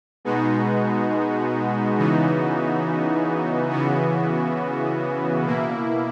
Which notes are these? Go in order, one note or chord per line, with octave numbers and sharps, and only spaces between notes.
B2 G#3 B3 D#4 F#4
C#3 E3 B3 D#4 F#4
C#3 E3 B3 F#4
B2 A#3 E4